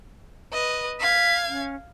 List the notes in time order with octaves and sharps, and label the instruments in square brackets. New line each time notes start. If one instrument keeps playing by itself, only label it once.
[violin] B4 D#5
[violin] F5 G#6 [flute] B6
[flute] C#4